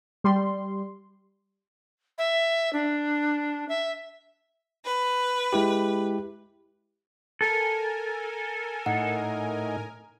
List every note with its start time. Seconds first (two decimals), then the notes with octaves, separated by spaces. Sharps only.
0.24 G3 C6
2.18 E5
2.73 D4
3.68 E5
4.84 B4
5.53 G#3 E4 G4
7.41 A4 A#4 G#5
8.86 A2 D#4 F#5